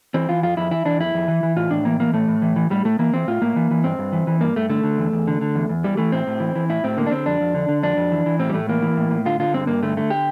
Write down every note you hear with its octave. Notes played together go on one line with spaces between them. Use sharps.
E3 C4
E3 F4
F2 F4
F2 E4
E3 E4
E3 D4
F2 E4
F2
E3
E3
A2 F4
A2 D4
E3 A#3
E3 A#3
A2 A3
A2
E3
E3
A2 G3
A2 A3
E3 A#3
E3 C4
A2 F4
A2 A#3
E3
E3
G2 C4
G2
E3
E3
G2 A#3
G2 A3
D3 A3
D3
E2
E2
D3
D3
E2
E2
E3 G3
E3 A3
A2 C4
A2
E3
E3
A2 E4
A2 C4
D3 A#3
D4
D3 C4
F2 D4
F2
D3
D3
F2 D4
F2
E3
E3
A2 C4
G3
A2 A3
E3 A#3
E3
A2
A2
D3 F4
D3 F4
G2 C4
G2 A#3
D3 A3
D3 A3
G4